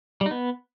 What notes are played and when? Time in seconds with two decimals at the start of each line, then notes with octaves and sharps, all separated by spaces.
0.21 G3
0.26 D#4
0.31 B3